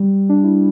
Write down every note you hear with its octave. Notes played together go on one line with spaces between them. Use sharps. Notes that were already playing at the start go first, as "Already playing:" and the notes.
Already playing: G3
D4
E4